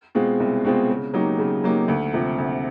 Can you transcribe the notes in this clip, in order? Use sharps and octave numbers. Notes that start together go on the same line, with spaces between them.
B2 G#3 C4 F4
C2
B2 G#3 C4 F4
C#3
F#3 A#3 D#4 G4
C#3
F#3 A#3 D#4 G4
D2
C3 F3
D2